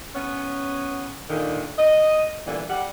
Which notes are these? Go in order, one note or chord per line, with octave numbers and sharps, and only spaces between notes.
B3 C#4
A#2 D3 D#3
D#5
A#2 D3 E3 G3 B3
G3 F#5